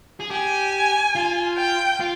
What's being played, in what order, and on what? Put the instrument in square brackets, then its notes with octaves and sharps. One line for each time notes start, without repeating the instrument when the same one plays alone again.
[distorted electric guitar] G#4
[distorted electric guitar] G4 [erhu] G#5
[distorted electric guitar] F4
[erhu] G5
[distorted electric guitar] F4